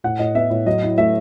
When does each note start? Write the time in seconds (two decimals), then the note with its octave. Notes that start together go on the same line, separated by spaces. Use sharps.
0.04 A2 F#5
0.19 A2 D#5
0.35 B3 E5
0.50 A2
0.66 F#3 D#5
0.83 E4
0.98 A3 E5